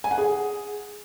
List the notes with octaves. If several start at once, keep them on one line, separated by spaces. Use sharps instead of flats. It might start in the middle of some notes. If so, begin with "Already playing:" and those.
G#5
F#5
G#4